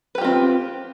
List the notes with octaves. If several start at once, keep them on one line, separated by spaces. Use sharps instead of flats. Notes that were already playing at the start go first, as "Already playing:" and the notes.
C4 F4 G4 B4